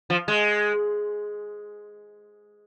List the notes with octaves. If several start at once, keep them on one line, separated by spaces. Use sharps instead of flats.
F3
G#3